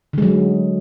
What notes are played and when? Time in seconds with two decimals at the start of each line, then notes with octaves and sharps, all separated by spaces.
0.13 D3
0.18 G#3
0.22 F#3